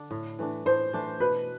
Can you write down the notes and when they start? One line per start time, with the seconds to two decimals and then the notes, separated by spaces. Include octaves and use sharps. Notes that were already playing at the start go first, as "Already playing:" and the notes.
Already playing: D3 D4
0.11 A2
0.39 E3 A3 D4
0.66 A2 C5
0.93 E3 A3 D4
1.20 B2 B4